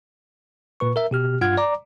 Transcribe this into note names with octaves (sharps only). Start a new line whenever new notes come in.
A#2 B4 C#6
A#4 E5
B2 G4 F6
G2 F4 F#5 F6 G#6
D5 A#5 D6